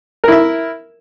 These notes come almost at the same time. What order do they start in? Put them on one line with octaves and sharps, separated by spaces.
A#4 E4 E5